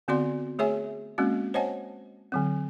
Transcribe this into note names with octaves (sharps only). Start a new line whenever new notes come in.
D3 B3 C4 F#4 D5 C6
A3 G#4 C#5 E5 G#5
G#3 A#3 C4 C#4 F#4
C5 C#5 D#5 F#5 G#5 A5
D3 F#3 C4